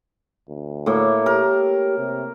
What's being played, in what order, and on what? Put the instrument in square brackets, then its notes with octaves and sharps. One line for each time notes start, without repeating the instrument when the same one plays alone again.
[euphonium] D2
[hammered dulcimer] A2 A#3 C#5
[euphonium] G4 [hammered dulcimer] A#4
[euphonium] C3